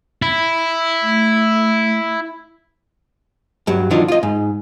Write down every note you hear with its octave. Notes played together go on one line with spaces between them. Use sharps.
E4
A3
G2 F#3
D#3 F3 F#3 D4 F4
F4 D#5
G#2